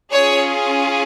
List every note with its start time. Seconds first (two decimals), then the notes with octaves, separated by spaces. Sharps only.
0.13 C#4 F4 G#4 C#5